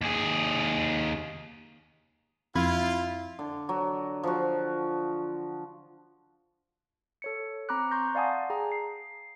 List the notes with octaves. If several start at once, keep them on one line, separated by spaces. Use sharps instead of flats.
D#2 G#4
F2 E4 F4 B5 G#6
D3
F#3
F3 F#4
A4 C#5 C#7
C4 A#5 B5 D6 F#6
A#5 C6 C#6 G6 A#6
D5 F5 F#5 G#5 A5 D#6
G#4 G5 A#5
C7